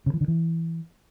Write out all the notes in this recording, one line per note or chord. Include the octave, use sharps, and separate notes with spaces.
C#3
E3
D3
E3